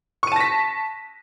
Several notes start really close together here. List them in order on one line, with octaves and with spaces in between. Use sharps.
C#6 D#7 A5 A#6 B6